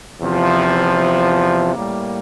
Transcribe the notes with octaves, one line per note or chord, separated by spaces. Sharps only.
E2 C3 F3
A2 G3 A#3